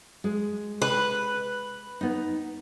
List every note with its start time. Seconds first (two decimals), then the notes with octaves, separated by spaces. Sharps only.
0.24 G#3
0.82 B4
2.01 B3 D#4